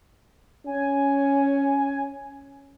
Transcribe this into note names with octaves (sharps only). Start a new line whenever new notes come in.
C#4 G#5